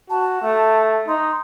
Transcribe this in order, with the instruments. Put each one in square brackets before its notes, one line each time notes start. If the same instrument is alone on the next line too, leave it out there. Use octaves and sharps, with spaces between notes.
[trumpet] F#4 [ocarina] A5
[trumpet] A3
[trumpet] D#4 [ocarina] C6